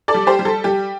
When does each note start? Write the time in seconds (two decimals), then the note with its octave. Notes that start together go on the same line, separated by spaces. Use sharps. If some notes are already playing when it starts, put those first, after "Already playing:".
0.08 A4 D5
0.14 G3
0.27 G4 C5
0.39 G3
0.45 A4
0.64 G3 G4